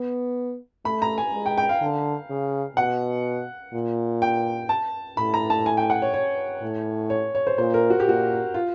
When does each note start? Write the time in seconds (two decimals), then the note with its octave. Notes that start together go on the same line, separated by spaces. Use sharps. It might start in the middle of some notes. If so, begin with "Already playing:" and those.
Already playing: B3
0.85 A3 B5
1.02 A#5
1.18 G#5
1.33 G#3
1.46 G5
1.58 G5
1.69 F5
1.81 D3
2.30 C#3
2.77 B2 F#5
3.74 A#2
4.22 G5
4.69 A5
5.17 A2 B5
5.34 A#5
5.50 A5
5.66 G#5
5.77 G5
5.90 F#5
6.02 C#5
6.14 C#5
6.62 A2
7.10 C#5
7.35 C#5
7.47 C5
7.58 A#2 C5
7.74 A#4
7.90 F#4
8.00 G4
8.06 A#2 F#4
8.54 F4